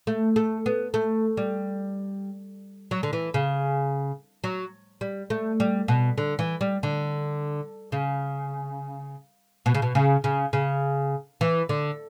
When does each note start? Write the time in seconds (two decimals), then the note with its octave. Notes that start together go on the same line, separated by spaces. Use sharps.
0.07 A3
0.36 A3
0.66 B3
0.94 A3
1.37 G3
2.91 F#3
3.03 D3
3.13 E3
3.34 C#3
4.44 F#3
5.01 G3
5.30 A3
5.60 G3
5.88 B2
6.18 D3
6.39 E3
6.61 G3
6.83 D3
7.92 C#3
9.66 B2
9.75 C#3
9.82 B2
9.95 C#3
10.24 C#3
10.53 C#3
11.41 E3
11.69 D3